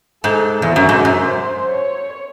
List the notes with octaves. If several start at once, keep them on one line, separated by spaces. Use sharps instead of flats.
G#2 A4
E2
F#2 F#4
G#2
F#2
C5
C#5